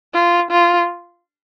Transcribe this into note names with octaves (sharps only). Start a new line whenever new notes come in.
F4
F4